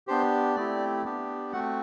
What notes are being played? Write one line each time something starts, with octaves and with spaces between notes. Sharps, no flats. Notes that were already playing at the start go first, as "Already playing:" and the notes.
B3 D4 G4 C5
A3 C4 E4 G4 D5
B3 D4 G4
A3 C4 F#4 F#5